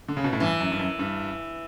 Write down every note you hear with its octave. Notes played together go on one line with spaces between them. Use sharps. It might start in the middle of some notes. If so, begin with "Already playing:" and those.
D3
C#3
B2
A2
G2 E3
F#2
G2
F#2
G2